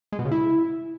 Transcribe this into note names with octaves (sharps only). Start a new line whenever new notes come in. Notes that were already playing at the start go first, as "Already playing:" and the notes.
G#3
B2
C#3
E4